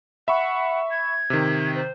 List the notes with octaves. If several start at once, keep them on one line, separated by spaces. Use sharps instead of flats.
E5 F#5 B5 C#6
G#6
C3 D#3
C5